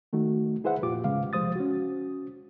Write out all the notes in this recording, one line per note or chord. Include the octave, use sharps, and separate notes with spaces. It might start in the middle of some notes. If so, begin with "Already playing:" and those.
D#3 A3 D#4 F#4
E4 G#4 B4 C5 E5 F#5
F2 A#2 F4 G4 D6
D2 G#2 C#3 G#3 F5
C2 F3 G#3 C5 D#6 A6
C#4 F#4